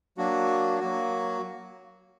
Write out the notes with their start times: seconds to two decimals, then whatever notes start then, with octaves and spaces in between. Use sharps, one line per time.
0.18 F#3 A#3 D4 F#4
0.80 F#3 A#3 F#4